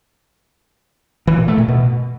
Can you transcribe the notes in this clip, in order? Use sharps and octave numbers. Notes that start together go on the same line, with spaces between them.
E3
A#2
A3
A#2
B2